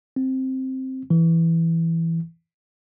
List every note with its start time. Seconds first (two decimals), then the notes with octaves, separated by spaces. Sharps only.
0.16 C4
1.10 E3